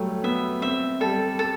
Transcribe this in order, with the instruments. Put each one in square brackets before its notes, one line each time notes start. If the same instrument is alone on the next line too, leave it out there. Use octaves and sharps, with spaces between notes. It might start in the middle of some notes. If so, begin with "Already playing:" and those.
Already playing: [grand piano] F#3 G3 A3
[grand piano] B3 [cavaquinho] E5
[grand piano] C4 [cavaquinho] E5
[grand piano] G3 [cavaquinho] A4
[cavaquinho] A4